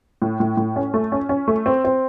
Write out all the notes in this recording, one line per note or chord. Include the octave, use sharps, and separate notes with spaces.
A2
A2
A2
C#4
A3
C#4
C#4
A3
C4
C4